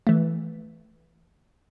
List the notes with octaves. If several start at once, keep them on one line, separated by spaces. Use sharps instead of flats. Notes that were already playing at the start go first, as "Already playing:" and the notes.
E3 A3